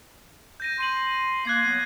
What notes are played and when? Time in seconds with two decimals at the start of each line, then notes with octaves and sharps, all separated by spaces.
0.60 G6 A#6 D#7
0.79 C6 G6 D#7 F#7
1.45 A#3 F#6 G#6 C7
1.64 F#3 B3